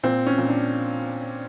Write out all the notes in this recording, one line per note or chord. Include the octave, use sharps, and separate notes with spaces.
A#2 C4
C#4
A#2
D4